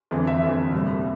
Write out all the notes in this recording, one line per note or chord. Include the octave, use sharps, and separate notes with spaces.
G1 F2 E3
E5
G1 F2 E3
C2 A#2 G3 C4